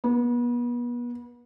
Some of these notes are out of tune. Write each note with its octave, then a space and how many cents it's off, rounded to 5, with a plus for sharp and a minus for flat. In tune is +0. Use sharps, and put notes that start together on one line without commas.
B3 -35